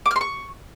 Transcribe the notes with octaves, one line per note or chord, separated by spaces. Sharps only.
D6
F6
C6
C#6